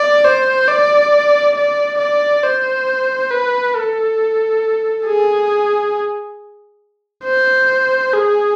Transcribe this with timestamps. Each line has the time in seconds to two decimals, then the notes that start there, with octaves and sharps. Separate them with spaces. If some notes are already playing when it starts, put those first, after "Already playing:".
Already playing: D5
0.25 C5
0.67 D5
1.56 D5
1.99 D5
2.43 C5
3.32 B4
3.75 A4
5.07 G#4
7.25 C5
8.14 G#4